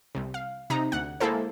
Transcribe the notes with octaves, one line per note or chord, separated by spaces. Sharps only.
C2 C3
F5
C3 D#4 A#5
D2 F#5
G#3 A#3 E4 A4 C5